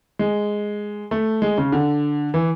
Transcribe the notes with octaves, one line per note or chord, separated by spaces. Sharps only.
G#3
A3
G#3
C#3
D3
E3